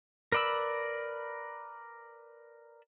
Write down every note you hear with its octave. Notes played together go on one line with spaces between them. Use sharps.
A#4 B4 D5 B5 E6